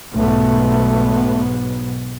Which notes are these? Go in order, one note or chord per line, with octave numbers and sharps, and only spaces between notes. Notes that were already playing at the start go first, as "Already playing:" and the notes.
B1 G#2 A3 B3